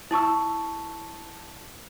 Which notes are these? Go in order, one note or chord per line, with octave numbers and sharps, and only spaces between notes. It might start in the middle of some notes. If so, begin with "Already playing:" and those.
E4 A5 C#6 E6